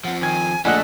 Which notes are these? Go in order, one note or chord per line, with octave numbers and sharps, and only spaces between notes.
F3 C4 F#5
D#3 G#5 G#6
A#1 A3 D4 D#5 F#5 G#5 F#6